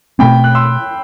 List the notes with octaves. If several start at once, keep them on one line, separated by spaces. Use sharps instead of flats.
B2 A3 C4 G5 B5
F#6
C6 E6